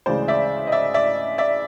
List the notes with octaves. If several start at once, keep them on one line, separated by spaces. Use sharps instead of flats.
D2 C#3 E3 G#3 C5 D5
D5 E5
D#5
D5 E5
D5 E5
D5 E5